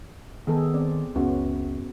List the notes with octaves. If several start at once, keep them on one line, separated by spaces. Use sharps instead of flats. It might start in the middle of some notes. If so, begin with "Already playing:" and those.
D#3 B3 G#4 A4
C4 D5
C#2 F#2 B3 C#4 F#4